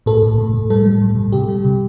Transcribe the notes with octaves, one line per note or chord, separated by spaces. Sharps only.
A2 A4
A2
A2
A2
G3 A4
G3
A2
A2
C3 G4
G3
C3